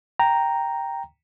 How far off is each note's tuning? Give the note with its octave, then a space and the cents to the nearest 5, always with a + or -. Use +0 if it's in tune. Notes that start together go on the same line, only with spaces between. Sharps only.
G5 +0 A#5 +0